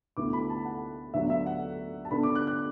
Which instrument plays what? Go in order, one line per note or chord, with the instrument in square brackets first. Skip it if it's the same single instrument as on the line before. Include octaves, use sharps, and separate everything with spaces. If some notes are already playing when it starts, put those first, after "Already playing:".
[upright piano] D2 D3 B3 E4 D6
B5
A5
F#5
D2 D3 F#3 B3 D4 E5
E5
F#5
A5
D3 B3 D4 B5
D6
F#6
F#6